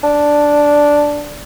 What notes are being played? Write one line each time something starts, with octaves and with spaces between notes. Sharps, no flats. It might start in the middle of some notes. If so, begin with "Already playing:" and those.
D4